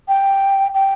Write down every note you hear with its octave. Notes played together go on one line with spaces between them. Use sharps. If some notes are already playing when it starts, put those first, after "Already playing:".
G5
G5